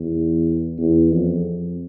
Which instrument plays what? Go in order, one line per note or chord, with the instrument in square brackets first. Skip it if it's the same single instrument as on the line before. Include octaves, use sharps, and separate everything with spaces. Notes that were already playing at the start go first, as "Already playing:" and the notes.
Already playing: [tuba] E2
E2
F2